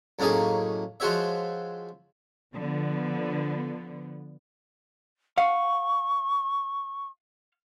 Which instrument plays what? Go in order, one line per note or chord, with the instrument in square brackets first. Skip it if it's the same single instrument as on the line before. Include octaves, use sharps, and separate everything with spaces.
[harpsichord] F#2 A2 A#3 C#4 D#4 G#4
F3 G#3 F#4 C5 C#5 E5
[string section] D3 F3 B3
[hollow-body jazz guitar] F5 F#5 [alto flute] C#6